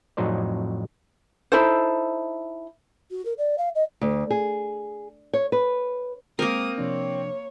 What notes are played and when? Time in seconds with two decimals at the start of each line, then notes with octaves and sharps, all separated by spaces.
0.17 F2 A2 F#3 D#4 C5 D5
1.52 D#4 E4 A4 C5
3.11 F#4
3.25 A#4
3.38 D5
3.58 F5
3.75 D#5
4.01 D2
4.30 G#4
5.34 C#5
5.52 B4
6.39 G#3 A#3 C4 A#4 D#6 F6
6.78 C3 F3 D4 C#5